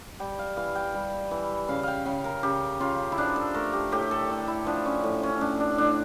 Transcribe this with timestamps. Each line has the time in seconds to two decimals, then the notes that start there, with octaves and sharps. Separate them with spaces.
0.20 G3 G5
0.39 F5
0.57 E3 F5
0.75 G5
0.95 G3
1.31 E3
1.68 C#3 F5
1.83 F5 G5
2.06 C#3 G5
2.24 A#4
2.43 C#3 G4
2.80 C#3 F4
3.12 E4
3.18 F3 D4
3.36 A4
3.54 A3 A#4
3.73 G4
3.92 A2 G4
4.11 A4
4.30 A2
4.48 E4
4.66 F3 D4
4.85 C#4
5.03 A2
5.23 C#4
5.41 A2 D4
5.60 D4
5.78 A2 D4